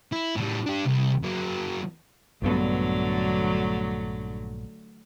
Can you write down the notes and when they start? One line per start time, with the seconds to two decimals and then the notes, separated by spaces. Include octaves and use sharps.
0.12 E4
0.36 A2 G3
0.66 D4 G4
0.85 C2
1.24 F#3 A#3
2.42 A#1 G2 D3 F#3 A3 B3